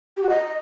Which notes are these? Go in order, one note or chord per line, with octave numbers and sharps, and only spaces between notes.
G4
F#4
D#5